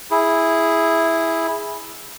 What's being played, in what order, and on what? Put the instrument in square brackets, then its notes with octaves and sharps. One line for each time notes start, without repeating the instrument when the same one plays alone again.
[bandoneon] E4 G#4